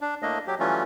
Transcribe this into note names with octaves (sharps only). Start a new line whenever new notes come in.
D4
A2 A3 A#3 D4 D#5
F#3 G4
E3 F#3 G3 A3 C#4 F4